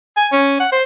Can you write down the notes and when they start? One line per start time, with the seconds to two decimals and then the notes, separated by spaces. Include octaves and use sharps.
0.17 G#5
0.32 C#4
0.60 F#5
0.72 C5